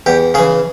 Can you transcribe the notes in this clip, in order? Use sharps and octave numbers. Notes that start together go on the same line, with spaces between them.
E2 G4
C#3 E3 G#4